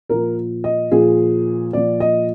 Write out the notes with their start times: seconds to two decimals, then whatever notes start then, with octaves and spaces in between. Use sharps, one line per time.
0.09 A#2 F3 A#4
0.64 D#5
0.92 A#2 F3 G#4
1.73 A#2 F3 D5
2.00 D#5